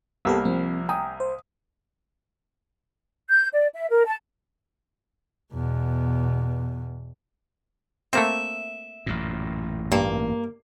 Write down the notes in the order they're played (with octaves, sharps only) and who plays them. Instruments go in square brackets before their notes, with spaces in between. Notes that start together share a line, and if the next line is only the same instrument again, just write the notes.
[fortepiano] C2 G3 A#3 [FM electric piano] B3 G4 A4
[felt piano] F3 [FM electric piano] C4
[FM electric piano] G5 G#5 A#5 [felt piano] D#6
[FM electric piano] C5
[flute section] G6
D5
E5
A#4
A5
[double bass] E2 B2
[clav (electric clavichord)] A3 A#3 C4 [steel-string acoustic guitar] E5
[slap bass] A1 F#2 A#2
[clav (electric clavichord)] G2 [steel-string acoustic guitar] A#3